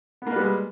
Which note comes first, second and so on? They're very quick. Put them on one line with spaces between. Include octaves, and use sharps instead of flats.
B3 A#3 B4 G3 G#3